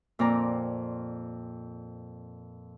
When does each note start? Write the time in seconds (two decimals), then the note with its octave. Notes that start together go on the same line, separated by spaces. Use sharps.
0.19 F2 A#2 C4 D5 A#5